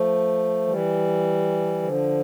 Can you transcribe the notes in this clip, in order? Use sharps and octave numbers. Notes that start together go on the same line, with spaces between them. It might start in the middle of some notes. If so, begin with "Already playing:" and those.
Already playing: F3 A3
E3 G3
D3 F3